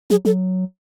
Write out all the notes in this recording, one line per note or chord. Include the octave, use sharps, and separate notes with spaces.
F#3 G#4
F#3 A4